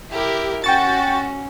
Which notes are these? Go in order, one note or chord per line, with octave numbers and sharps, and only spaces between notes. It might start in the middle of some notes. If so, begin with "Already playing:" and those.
E4 G4 A#4
C#4 F#4 G5 C#6 A6